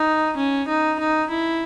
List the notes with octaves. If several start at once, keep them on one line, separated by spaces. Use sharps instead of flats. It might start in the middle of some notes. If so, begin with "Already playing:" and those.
Already playing: D#4
C#4
D#4
D#4
E4